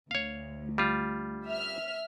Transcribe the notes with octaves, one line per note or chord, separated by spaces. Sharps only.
D2 C#5 F5
G3 F4
E5 F6